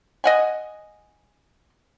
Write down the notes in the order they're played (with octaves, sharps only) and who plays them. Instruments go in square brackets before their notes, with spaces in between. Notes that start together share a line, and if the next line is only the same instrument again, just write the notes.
[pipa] D#5 F#5 G#5